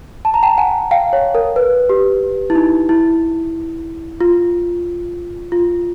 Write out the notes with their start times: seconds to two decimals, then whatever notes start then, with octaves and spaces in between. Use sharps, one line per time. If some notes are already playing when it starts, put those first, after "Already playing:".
0.25 A5
0.34 A#5
0.43 G5 A5
0.58 F#5 G#5
0.91 F5 G5
1.13 C#5
1.35 A#4
1.56 B4
1.89 G4
2.50 E4
2.55 D#4
2.89 E4
4.21 F4
5.52 F4